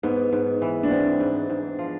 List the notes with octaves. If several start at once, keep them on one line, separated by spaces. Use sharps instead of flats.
G#2 B3
G#2
E3
D4
B3 C4
G#2
G#2
F3